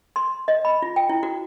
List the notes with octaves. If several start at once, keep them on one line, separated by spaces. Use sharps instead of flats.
C6
D#5
B5
F4
G5
E4
F#4